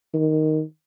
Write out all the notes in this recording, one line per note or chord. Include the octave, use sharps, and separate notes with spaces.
D#3